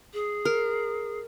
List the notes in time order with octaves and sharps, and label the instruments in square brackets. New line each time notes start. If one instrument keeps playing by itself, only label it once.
[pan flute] G#4
[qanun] A#4